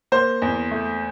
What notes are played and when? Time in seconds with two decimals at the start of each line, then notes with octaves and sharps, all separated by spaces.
0.12 A#3 C5
0.42 E2
0.71 A3